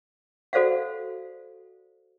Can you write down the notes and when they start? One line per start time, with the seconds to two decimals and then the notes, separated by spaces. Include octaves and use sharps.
0.53 F#4 A4 C5 D5 F5 F#5